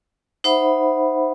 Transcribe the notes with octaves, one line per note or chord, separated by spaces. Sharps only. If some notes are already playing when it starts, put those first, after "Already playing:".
D#4 C5 E5 F#5 B5